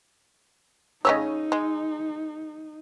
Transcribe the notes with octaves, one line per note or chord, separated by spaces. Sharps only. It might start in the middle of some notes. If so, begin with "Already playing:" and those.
C#3 C#4 D#4 C#5 D#5 E6
G#3